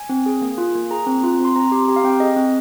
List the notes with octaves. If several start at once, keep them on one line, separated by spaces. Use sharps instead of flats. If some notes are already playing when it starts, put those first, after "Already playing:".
Already playing: G#5
C4
G#4
A#3
F4
A#3
G#4 A#5
C4
F4
C4
C6
C4 A#5
G4 C6
G4 A#5
F5
C4 G5
G#4 D#5
C4